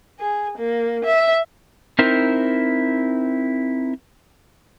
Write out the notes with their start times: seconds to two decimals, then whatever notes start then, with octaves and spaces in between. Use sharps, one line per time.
0.20 G#4
0.58 A#3
1.05 E5
1.99 C4 D#4 E4 A#4 C5